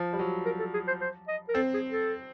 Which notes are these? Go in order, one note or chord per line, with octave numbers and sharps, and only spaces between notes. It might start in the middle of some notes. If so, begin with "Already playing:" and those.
Already playing: F3
G3
F#3
A#4
A4
G#4
C5
C5
D#5
A#4
C4 A4
G#4
A4